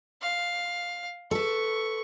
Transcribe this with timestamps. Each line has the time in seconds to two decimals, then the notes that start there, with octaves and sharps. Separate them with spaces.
0.22 F5
1.31 A4 B4 C#6